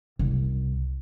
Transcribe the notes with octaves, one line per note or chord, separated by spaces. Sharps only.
C2